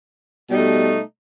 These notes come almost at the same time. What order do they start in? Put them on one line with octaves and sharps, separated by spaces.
B2 G3 D#4 A3